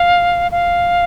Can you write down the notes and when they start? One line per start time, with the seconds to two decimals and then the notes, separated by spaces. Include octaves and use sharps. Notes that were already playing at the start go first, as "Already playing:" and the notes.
Already playing: F5
0.52 F5